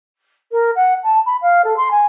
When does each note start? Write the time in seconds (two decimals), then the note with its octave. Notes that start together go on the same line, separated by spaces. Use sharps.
0.51 A#4
0.75 F#5
1.03 A5
1.26 B5
1.41 F5
1.64 A4
1.76 C6
1.91 G#5